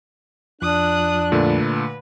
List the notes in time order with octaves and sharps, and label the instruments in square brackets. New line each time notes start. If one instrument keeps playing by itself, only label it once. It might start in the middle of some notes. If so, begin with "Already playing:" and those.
[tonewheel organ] F2 F3 [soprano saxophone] D4 [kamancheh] D#6 F#6
[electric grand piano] A#2 D3 A3 [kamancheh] B4